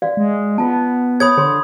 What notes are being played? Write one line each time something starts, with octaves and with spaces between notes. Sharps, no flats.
F#4 D5 F5
G#3
B3 F4 A5
G#4 C#5 B5 D#6 G#6
D3 G#4 C#5 C6